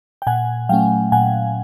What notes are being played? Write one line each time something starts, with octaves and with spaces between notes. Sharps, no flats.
G5
A#2 F#5 G#5
F#3 A3 C#4 F5 G5
A#2 F#5 G#5